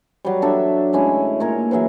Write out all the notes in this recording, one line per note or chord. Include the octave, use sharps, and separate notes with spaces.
F#3 G3
D4 A4 E5
A2 G#3 C#4 E4
A#2 A#4 C#5
E3 F#3 G#4 E5